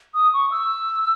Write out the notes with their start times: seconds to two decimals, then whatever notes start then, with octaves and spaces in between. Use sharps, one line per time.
0.14 D#6
0.33 C#6
0.51 E6